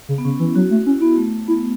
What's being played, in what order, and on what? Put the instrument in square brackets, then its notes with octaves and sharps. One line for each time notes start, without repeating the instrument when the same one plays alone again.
[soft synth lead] C#3
[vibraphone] B3
[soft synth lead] C#3 [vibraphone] C#4
[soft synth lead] E3 [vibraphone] E4
[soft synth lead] F#3 [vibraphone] F#4
[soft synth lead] A3
[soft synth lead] C#4 [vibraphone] E4
[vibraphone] B3 [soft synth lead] E4
[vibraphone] A3
[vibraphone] B3 [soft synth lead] E4